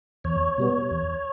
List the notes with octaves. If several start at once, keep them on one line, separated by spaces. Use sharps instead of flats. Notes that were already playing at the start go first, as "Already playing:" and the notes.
E2 C#5
B2 G3 B3
E2